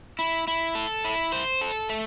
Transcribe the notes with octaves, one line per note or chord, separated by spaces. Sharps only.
E4
E4
A4
E4
C5
A4
A3